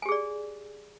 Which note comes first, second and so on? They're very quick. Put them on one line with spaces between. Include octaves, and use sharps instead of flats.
G#5 G4 G#4 D5